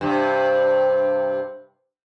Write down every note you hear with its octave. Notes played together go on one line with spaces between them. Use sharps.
G2 C3